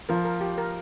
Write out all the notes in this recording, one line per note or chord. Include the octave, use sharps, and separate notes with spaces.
F3 A#4
A#4
G4
A#4